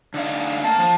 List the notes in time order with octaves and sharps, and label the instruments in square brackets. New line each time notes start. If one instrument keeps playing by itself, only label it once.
[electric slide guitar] D3 D#4 F5
[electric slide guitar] A#3 [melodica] A5
[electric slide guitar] F3